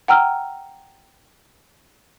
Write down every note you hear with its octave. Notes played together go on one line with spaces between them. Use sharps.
F#5 G5 A#5 E6 F6